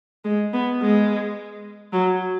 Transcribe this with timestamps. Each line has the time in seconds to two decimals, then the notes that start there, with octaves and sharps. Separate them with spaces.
0.25 G#3
0.53 B3
0.82 G#3
1.93 F#3